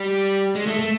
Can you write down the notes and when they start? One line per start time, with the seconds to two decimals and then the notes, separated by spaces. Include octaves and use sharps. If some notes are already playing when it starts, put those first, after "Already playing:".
Already playing: G3
0.55 G#3
0.66 A3
0.79 A3